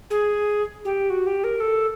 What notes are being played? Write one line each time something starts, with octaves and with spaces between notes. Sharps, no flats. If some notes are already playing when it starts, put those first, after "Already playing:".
G#4
G4
F#4
G4
A#4
A4